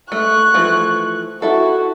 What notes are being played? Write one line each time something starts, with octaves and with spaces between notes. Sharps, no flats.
A3 C#6 F#6
E3 F3 A3
E4 F#4 A4